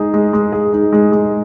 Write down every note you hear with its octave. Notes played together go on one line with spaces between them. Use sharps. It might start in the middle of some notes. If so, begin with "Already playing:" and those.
Already playing: G#3 D#4 G#4
G#3
G#3
G#4
D#4
G#3
G#3